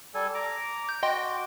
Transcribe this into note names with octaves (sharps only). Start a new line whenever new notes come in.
G3 A4 G#5
A#5 D6
G6
F#4 D#5 G5 C6 D6